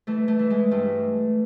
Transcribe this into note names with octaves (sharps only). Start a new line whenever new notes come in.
E3 A3
A3
E3
G#3
G2 A3